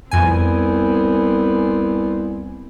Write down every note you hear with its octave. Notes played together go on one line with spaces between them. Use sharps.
C2 F2 B3 C4 G#5